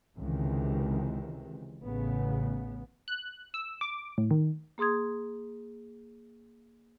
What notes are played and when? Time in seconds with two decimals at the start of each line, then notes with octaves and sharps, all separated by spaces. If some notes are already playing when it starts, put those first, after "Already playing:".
0.17 C#2 C3 D#3 E3
1.82 A1 C#3 B3
3.08 F#6
3.54 E6
3.81 D6
4.18 A2
4.31 D#3
4.78 A#3 G#4 C6 D#6 G#6